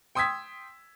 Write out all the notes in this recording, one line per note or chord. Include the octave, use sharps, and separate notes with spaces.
G5 C6 D#6 E6 G#6 B6